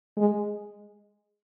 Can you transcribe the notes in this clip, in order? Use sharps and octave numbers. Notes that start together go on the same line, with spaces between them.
G#3